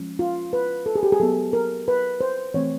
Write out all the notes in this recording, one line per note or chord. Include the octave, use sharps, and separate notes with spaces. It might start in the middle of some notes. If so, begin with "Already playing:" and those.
Already playing: F3 G#3 C#4
F4
B4
A4
G#4
G4
G#4
F#3 B3 A4
A#4
B4
C5
E3 A3 C4 C#5